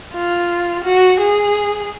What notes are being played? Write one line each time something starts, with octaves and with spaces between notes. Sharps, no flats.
F4
F#4
G#4